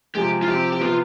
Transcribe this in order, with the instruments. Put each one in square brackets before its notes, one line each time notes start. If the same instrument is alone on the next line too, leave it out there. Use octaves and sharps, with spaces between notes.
[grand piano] C3 F3 G#3 [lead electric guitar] G4
[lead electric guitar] F4
[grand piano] C3 F3 C4 [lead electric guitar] G4
[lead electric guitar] G4
[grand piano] C3 F3 B3 [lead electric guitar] F4